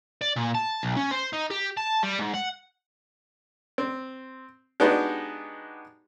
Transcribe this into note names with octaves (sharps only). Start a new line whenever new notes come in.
D5
A#2
A5
B1
C#4
C5
D#4
G4
A5
G3
G#2
F#5
C4
G#3 B3 D4 D#4 F#4 G4